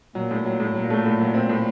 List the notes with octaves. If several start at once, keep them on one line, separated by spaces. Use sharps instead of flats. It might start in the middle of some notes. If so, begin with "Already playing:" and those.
A#2 F#3
A2
F#3
A2
A#2 F#3
A3
A2
F#3
C4
A2